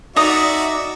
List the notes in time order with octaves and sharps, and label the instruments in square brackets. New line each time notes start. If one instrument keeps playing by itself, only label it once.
[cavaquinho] D#4 D#6 [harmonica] F#4 D5 E5